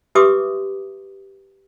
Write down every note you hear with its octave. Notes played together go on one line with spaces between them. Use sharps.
G4 B4 E5 C6 D6 D#6